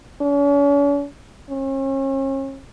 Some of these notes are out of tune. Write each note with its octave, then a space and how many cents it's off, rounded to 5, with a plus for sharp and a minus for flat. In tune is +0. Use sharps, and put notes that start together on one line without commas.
C#4 +45
C#4 -40